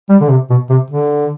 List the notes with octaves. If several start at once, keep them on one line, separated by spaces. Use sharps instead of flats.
G3
D3
C3
B2
C3
D3